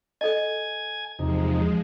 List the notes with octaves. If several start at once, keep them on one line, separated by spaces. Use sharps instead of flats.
A4 D#5 G#5 G#6
E2 C3 F3 G#3 D#4